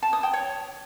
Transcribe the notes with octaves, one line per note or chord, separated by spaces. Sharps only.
A5
D#6
G5
C#5